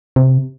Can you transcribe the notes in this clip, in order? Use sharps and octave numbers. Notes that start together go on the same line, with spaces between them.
C3